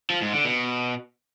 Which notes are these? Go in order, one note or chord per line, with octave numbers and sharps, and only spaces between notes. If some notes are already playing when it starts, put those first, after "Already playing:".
F3
G#2
D3
B2